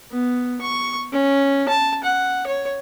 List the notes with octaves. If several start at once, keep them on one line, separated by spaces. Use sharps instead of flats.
B3
C#6
C#4
A5
F#5
C#5